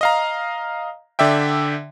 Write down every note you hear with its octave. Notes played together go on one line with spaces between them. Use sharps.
D#5 F5 A#5
D3 D5 E5 G5